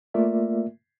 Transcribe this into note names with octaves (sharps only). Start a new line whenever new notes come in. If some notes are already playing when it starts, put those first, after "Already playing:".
A3 A#3 F4 A#4 D5 E5